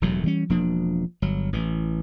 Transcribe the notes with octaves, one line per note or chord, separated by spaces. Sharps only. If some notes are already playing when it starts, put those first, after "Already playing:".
E1 D#2 A2 F#3
E3 G3 B3 C#4
E1 F3 A#3 D4
G1 F#3
A1 E3